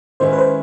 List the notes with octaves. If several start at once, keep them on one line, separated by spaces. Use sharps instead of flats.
D#3 G#3 C#4 E4 C5
B4
C5